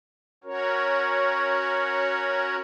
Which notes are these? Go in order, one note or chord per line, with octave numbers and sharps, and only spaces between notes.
C#4 F#4 A#4 C#5